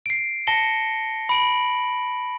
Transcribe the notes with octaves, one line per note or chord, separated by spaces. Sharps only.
C7 D7
A5 A#6 C#7 G7
B5 D7 F#7